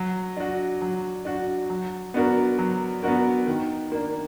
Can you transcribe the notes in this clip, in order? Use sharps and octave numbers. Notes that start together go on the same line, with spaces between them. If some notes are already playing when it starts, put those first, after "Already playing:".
Already playing: F#3
D4 F#4
F#3
D4 F#4
F#3
B3 D4 F#4 A#4
F#3
B3 D4 F#4 A#4
D#3
A#3 D4